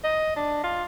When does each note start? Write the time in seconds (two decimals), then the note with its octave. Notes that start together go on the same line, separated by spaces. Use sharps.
0.04 D#5
0.36 D4
0.64 F4